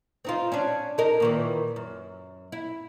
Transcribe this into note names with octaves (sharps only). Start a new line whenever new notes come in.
C4 D#4 F4
C#4 D4
D#4 A#4
A#2 D#3 E3
F#2
E4